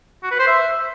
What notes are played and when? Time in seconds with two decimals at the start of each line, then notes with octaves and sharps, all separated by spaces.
0.23 F#4
0.31 B4
0.39 C5
0.47 E5